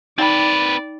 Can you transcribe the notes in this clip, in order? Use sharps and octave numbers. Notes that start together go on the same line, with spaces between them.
C4 D#4 B4 D5 G5 B5